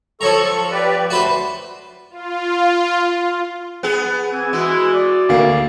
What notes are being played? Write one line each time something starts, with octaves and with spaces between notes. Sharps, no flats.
F3 A4 C#5 A#5 C#6
G4 B4 D5
D2 A3 F#4 B4 C5
F4
B3 G#4
E3 C4 G#5
E3 G#3 E4 F#4
D5
D2 A#3